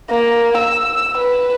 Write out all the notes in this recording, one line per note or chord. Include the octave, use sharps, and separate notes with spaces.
A#3
E6
B4